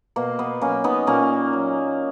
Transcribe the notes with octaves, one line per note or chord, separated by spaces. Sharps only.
B2 A#3
B3
F#3 A#3 C#4
B3 D#4
A#2 A#3 C#4
F#3